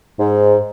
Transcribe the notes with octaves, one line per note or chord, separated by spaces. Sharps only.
G#2